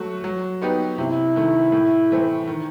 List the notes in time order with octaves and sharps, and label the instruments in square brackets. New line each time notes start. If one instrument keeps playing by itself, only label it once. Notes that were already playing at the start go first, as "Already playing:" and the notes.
Already playing: [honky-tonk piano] F#3 A3 F#4
F#3
B3 D#4 G4 B4
[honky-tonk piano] C3 [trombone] E4
[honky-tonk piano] D#3 A3
A2
E3 A3 C4
D#3